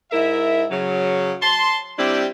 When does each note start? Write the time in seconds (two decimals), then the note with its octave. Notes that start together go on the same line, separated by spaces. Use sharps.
0.11 G#2 E4 A#4 E5
0.70 C#3 F#3
1.41 A5 C6
1.98 G3 C4 D4 E4 G4